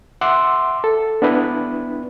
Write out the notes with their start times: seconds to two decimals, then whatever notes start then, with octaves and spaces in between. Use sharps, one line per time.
0.21 E5 F#5 C6 D6 E6
0.84 A4
1.22 B3 D4 E4 B4